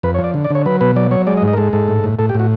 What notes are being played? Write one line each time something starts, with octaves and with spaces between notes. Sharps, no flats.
F2 B4
C#5
F3
D5
D3
D5
D3 C#5
F#3 B4
B2 B4
F#3 D5
F#3 C#5
G#3 D5
D#5
G#2
D#5
A#4
G#3 A4
G#2 A4
A2
A2
A2 A4
G4
A2 F#4